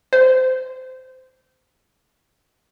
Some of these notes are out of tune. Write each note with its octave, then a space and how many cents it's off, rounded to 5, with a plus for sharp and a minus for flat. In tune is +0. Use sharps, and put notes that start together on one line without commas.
C5 -20